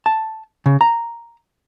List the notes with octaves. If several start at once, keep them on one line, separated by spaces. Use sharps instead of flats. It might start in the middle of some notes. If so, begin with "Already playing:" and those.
A5
C#3
A#5